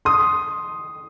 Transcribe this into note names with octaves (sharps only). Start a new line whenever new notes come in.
C6 D#6